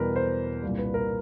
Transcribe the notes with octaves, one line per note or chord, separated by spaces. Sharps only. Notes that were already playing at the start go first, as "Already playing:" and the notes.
Already playing: E2 B2 G3 A#4 B4
C5
C2 A#2 G3
B4
A#4